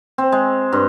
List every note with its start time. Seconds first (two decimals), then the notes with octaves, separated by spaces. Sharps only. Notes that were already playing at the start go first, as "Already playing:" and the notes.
0.18 C4
0.32 G#3
0.72 G2